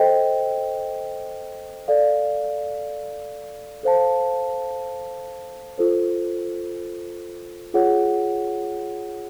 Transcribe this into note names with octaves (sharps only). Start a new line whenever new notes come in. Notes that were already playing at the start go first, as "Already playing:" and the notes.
Already playing: A4 C5 D#5 G5
A4 D5 F5
A4 C5 F5 A5
F4 A4 C5
F4 G#4 C#5 F#5